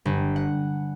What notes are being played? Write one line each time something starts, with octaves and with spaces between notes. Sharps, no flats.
G1
F#5